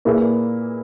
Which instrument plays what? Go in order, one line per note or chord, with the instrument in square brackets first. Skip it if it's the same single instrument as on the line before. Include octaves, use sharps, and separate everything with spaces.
[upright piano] A#2 A#3 E4 G#4 B4